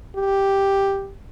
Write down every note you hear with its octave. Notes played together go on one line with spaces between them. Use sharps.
G4